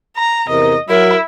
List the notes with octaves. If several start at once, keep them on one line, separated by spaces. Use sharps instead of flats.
A#5
E2 C3 A#4 D#5
F#3 E4 A#4